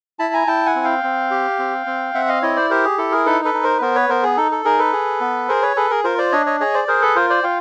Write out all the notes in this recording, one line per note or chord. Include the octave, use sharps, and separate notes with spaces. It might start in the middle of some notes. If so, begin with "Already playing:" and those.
E4 A5 B5
G#5 A#5
E4 G5 A5
F#5 G#5
C4
F5 G5
C4
G4
C4
C4
C4 E5 F#5
D#5 F5
E4 C#5 D#5
C5 D5
G4 A#4 C5
G#4
E4 A4
G#4 A#4
D#4 A4 B4
A4 B4
D#4
A#4 C5
B4
B3 A#4 C5
B4 C#5
B3 A#4 C5
G#4
D#4 A4
A4
D#4 G#4 A#4
A4 B4
G#4
B3
G#4 A#4 C5
B4 C#5
G#4 A4 B4
G#4 A#4
F4 A#4 C5
C5 D5
D4 C#5 D#5
C#5 D#5
G#4 C#5 D#5
C5 D5
G#4 A#4 C5
A4 B4
F4 A#4 C5
C5 D5
F4 F5 G5